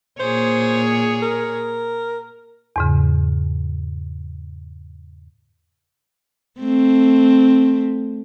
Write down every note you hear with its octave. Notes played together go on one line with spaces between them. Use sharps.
A#2 G#4 C5 C#5
A#4
E2 G#2 C#3
A3 C4